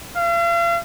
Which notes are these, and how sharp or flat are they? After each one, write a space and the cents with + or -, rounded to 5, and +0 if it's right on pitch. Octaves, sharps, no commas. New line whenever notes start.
F5 -40